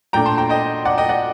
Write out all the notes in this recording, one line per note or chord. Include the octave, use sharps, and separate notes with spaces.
A#2 A3 D4 G5 A#5
A5 C6
G5 A#5
D#5 G5
D5 F#5
D#5 G5
D5 F#5